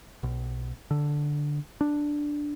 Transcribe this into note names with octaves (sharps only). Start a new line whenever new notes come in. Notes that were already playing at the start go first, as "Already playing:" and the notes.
B1
D3
D4